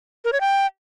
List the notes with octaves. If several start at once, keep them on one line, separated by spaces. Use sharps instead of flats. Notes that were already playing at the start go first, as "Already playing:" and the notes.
A#4
C#5
G5